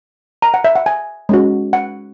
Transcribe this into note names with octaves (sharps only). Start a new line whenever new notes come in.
A#5
F#5
E5
F#5
G#5
G#3 C#4 F#4
F#5